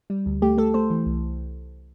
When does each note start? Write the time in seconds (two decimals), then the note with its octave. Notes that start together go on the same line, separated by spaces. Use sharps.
0.10 G3
0.26 D2
0.42 A3 G4
0.57 A3 A4
0.74 A3 C5
0.90 E3
1.06 C2